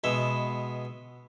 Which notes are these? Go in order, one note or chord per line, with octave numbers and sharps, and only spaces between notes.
B2 G#3 B3 E5